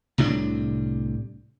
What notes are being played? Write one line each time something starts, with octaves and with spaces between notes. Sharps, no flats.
C2 A2 C3 D4